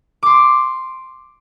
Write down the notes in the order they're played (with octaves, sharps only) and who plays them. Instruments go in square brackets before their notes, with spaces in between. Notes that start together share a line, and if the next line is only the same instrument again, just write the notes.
[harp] C6 D6